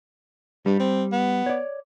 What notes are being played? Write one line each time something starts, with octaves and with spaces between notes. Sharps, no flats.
G2 G3
C4
B3
C#5 D5